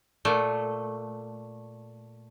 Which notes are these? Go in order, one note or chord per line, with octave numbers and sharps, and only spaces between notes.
A#2 A3